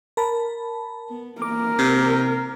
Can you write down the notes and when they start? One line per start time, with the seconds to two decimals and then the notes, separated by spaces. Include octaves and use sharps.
0.17 A#4 A5 B5
1.10 B3
1.42 A#3 A#4 D6
1.79 C3